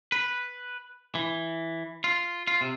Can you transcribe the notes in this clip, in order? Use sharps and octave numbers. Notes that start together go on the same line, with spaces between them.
B4
E3
F4
F4
C3